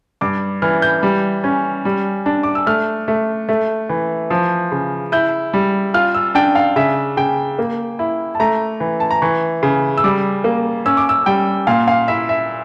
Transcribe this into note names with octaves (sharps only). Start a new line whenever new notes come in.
G2 D6
E3 F6
G6
G3
C#4
G3
D4
D6
E6
A3 F6
A3
A3
E3
F3
C#3
E4 G6
G3
F4 F6
E6
D4 G5
F5
C#3 E5
C#3 G5
A#3
E4
A5
A3 A#5
E3
A5
A#5
E3 C#6
C#3
E6
G3 D6
A#3
C#4 E6
D6
E6
G3 G5
A#2 F5
F5
E4 E5
E5